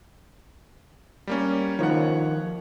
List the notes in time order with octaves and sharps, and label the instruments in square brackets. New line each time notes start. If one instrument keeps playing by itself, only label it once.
[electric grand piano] G3 A#3 C#4
[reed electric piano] D#3 F3 [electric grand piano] C#5 F#5